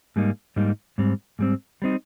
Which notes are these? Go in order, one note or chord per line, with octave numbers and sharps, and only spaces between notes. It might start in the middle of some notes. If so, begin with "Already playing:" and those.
G#2 G3 A#3 D#4
G#2 G3 A#3 D#4
G#2 G3 C4
G#2 G3 C4
G3 C4 D#4